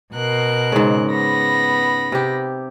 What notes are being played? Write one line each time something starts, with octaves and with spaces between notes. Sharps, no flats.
B2 A#4 F#6
G#2 C#3
B3 B5 A#6
C3 G4